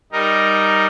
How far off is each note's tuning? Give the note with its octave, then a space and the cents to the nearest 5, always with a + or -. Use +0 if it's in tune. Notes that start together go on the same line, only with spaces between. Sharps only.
G3 +0 D#4 +0 A#4 +0